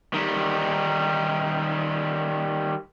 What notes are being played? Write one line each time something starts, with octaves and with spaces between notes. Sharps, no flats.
D#3 G3